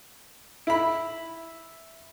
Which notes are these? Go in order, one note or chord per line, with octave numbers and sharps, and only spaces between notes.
E4 B5